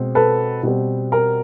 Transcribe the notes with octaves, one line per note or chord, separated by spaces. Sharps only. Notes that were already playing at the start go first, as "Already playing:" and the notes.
Already playing: B2 G#3 C4
A4 B4
B2 G3 C4
A#4